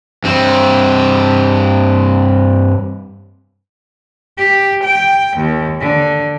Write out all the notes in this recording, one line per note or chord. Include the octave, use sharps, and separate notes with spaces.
G2 C4
G4
G5
D#2
D3